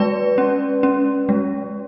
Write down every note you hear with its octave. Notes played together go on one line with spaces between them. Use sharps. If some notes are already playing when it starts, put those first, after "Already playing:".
Already playing: G#3 B4 D5
C#4
C#4
G#3